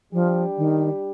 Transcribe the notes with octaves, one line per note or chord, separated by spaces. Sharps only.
F3 G3 D4 G4
D#3